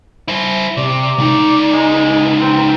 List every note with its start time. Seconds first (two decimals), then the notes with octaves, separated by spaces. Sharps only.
0.28 E4 C5
0.77 C3 D5
1.19 C#2 D#4
1.73 G#3
2.41 C4